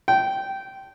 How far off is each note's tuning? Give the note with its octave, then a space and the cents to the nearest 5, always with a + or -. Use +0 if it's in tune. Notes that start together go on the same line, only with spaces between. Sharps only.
G5 -15